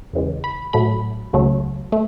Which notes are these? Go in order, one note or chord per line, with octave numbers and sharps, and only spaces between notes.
E2 C#3 E3 G#3
B5
A2 F#3 A3 B5
C#2 C#3 F#3 A3
A3